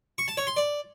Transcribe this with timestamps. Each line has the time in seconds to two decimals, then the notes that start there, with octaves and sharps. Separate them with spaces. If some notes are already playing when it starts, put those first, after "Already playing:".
0.18 C#6
0.28 A5
0.37 C#5
0.47 C6
0.57 D5